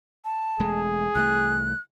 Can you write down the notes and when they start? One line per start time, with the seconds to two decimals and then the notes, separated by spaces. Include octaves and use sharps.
0.25 A5
0.60 E1 G#3 A3 G#4
1.15 C2 E3 A3 F#6